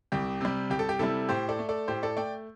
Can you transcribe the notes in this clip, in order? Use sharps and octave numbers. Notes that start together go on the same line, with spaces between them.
C2 G4
C3 G3
C2 G4
A4
G4
C3 G3 E4 A4
A2 G4 C5
A4 D5
A3
A4 D5
A2 G4 C5
A4 D5
A3 D5 G5